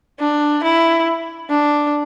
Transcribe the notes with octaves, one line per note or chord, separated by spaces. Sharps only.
D4
E4
D4